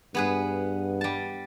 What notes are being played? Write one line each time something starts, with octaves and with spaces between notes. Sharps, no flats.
G2 B3 G#4 B4
G3 A5